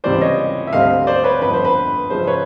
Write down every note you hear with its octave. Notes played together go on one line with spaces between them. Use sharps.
C#2 C3 E3 G3 C5 D5
C#5 D#5
E5
D2 D3 G3 C4 D#5 F5
C5 D5
B4 C#5
G1 F2 D3 B4
C5
B4
F#2 C#3 F3 G#3 C5
B4 C#5